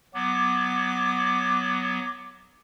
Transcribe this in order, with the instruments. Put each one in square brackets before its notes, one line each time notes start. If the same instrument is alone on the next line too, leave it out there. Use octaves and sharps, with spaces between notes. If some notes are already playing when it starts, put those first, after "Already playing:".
[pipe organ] F#3 B3 [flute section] D6